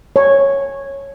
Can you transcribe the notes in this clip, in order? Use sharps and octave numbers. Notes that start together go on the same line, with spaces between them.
C#5